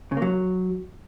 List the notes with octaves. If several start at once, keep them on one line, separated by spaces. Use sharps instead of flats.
C#3
A#3
F#3